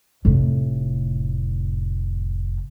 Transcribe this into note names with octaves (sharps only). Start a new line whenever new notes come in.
F1 A2